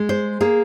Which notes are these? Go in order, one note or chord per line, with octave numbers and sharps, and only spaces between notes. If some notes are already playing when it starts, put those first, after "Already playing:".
Already playing: G#3
C5
A#3 G#4